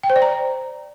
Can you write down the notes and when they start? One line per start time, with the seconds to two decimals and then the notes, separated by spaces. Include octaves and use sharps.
0.03 G5
0.10 C5
0.16 D5
0.22 A#5